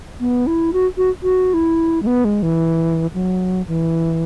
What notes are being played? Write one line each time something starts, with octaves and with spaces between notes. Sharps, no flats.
B3
E4
F#4
F#4
F#4
E4
G#3
B3
G#3
E3
F#3
E3